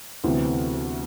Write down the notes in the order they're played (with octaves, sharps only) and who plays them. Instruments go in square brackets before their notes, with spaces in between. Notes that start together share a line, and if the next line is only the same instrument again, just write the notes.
[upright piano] D2 C3 E3 B3